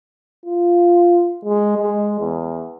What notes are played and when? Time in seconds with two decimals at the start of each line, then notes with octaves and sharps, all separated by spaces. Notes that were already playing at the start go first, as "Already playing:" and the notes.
0.46 F4
1.45 G#3
1.78 G#3
2.20 E2